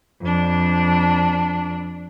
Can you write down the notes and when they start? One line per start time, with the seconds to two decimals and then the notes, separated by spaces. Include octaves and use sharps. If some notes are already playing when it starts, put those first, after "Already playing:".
0.21 F2 D4